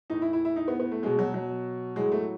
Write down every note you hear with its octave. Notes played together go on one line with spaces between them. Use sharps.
A2 E3 D#4
E4
E4
E4
D#4
B3
B3
A3
B2 F#3 G#3
F#3
F#3
A2 F#3 G#3
A3